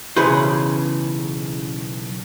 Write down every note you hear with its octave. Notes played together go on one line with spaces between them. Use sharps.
B1 C#3 E3 G#4 B4 C5